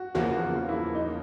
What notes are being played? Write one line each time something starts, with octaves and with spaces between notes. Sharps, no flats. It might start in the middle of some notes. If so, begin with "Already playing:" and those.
Already playing: F#4
E2 C#3 F3 A#3 F#4
F4
E4
D#4